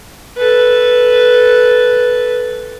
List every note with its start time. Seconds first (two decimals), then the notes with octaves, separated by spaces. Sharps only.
0.37 A4 B4